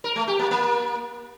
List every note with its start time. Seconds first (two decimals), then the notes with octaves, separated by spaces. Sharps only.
0.04 A#4
0.16 A3
0.28 G4
0.39 A#3
0.51 A#3